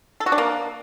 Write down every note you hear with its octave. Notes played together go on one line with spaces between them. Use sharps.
A4
F#4
D4
A#3